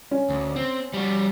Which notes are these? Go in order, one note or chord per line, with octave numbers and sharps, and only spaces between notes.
C#4
D2
C4
G3 F#4